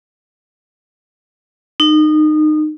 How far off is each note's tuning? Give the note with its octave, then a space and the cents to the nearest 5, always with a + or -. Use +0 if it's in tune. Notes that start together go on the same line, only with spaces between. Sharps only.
D#4 -25